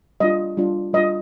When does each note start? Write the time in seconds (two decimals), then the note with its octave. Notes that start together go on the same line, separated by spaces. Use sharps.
0.20 G3 D4 F4 D#5
0.57 G3 D4 F4
0.93 G3 D4 F4 D#5